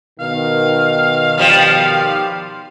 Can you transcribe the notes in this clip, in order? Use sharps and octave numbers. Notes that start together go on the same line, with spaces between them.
B2 D#3 F5
F3 G3